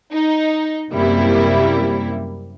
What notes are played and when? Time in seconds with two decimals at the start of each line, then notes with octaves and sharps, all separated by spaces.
0.13 D#4
0.93 F#2 C3 G3 A#3 E4